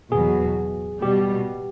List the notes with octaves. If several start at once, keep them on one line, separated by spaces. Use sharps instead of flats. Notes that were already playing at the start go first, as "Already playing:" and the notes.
E2 B2 F#3 G#4
B2 G3 G4